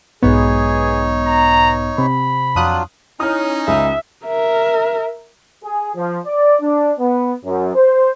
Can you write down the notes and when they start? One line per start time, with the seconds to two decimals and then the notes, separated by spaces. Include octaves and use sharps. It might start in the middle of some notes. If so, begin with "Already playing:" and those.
0.23 B1 G#2 B3 D#4 G#4 C#5
1.26 A#5
1.98 C3 B5
2.55 F2 F#3 D4 F4 D#6 F#6
3.20 C#4 D#4 E4 C#5 D#6 F6
3.67 C#2 E5 D#6
4.26 A#4 E5
5.63 G#4
5.95 F3
6.25 D5
6.61 D4
6.99 B3
7.44 F#2
7.75 C5